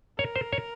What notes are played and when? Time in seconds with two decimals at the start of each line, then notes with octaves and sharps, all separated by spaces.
0.19 A#4 C#5
0.36 C5
0.53 C#5